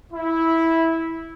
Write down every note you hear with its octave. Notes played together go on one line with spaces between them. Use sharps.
E4